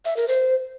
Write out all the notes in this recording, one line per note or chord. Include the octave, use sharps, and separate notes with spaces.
E5
A#4
C5